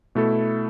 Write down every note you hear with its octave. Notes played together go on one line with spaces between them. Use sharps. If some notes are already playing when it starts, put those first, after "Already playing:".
B2 A3 E4 A4